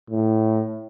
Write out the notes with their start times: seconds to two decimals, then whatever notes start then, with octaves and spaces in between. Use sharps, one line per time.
0.10 A2